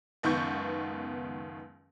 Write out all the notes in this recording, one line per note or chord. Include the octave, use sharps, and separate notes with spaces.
F#1 C#2 D#3 B3 C#6 G6